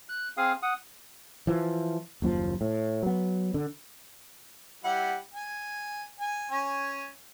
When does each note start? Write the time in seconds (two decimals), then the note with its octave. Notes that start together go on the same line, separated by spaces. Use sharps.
0.09 F#6
0.37 C4 G#4 F5 D#6
0.62 F#5 D#6
1.47 E3 F3
2.22 F#1 D#2 F3
2.61 A2
3.03 F#3 B3
3.54 D3
4.84 G3 E4 F#5
5.34 G#5
6.20 G#5
6.51 C#4 G#5